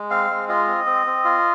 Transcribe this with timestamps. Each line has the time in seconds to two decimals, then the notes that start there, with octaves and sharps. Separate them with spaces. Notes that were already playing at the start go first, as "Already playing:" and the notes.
Already playing: G#3
0.10 C4 F5
0.30 G#3
0.49 F4 D#5
0.67 C4
0.86 C4
1.07 C4
1.25 F4